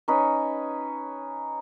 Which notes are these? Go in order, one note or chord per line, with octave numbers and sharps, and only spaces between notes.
C#4 D#4 B4